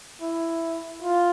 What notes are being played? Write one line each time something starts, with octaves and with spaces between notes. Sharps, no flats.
E4
F4